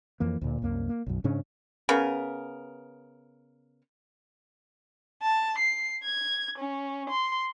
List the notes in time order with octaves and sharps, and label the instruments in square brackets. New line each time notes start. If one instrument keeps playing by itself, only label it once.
[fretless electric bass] F2 E3 A#3
D2 A#2
C2 F#2 A#3
A#3
B1 F#2
G#2 C#3 C#4 D4
[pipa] C#3 B3 A#4
[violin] A5
C7
G#6
C#4
C6